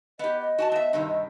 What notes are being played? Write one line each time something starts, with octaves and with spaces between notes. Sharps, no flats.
B3 G4 D#5
D#5
F#4 G#5 A5
B3 E5
G2 C3 D#3
D#5